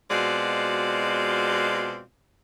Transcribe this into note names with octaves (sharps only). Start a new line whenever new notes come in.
B2 G#3 C4 F4 F#4 D5